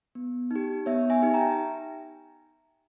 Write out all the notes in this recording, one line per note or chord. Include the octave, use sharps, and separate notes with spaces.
B3
D#4 G4
B3 C#5 E5
E5 G#5
D#4 G4
G5 A#5